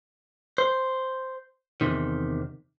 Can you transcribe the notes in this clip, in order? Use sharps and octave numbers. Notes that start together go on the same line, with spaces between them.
C5
E2 C3 D#3